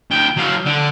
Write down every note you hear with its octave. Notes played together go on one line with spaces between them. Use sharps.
D2 G5
F#3 F5
D3